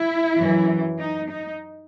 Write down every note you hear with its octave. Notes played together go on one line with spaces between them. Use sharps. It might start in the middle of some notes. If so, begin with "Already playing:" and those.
Already playing: E4
F#2 E3
D#4
D#4